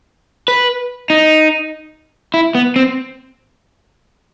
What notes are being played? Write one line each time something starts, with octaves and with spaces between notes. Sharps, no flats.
B4
D#4
E4
B3
C4